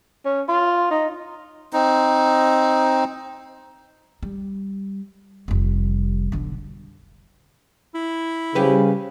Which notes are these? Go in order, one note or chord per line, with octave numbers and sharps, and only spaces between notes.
C#4
F4
D#4
C4 D#4
G3
F1 G3
B1 D3
E4
C#3 G3 G4 B4